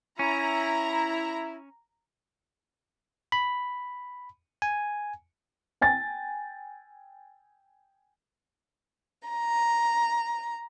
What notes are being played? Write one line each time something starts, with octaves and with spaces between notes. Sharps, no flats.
C#4 E4 A#5
B5
G#5
G5 G#5 A6
A#5